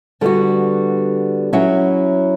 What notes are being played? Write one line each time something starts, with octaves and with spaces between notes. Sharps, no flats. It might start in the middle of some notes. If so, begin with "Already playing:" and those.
D3 G3 B3 F#4
F#3 C#4 E4